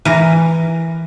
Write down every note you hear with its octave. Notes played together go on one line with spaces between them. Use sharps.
E3 A#4